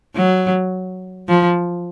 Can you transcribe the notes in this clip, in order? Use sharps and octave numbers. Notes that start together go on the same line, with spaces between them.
F#3
F3